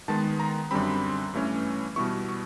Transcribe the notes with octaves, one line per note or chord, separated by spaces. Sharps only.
D#3 G#3 B3 A5
A#5
F#2 D3 G3 C4 B5
G2 E3 A3 C#4
B2 G3 B3 E4 C#6
C#6